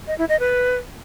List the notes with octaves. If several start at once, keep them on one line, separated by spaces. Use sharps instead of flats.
D#5
E4
D#5
B4